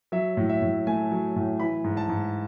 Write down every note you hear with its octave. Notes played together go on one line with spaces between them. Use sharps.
F#3 E5
A2
E5
A2
A3 G#5
F#3
A2
E3 B5
G#2
A5
G#2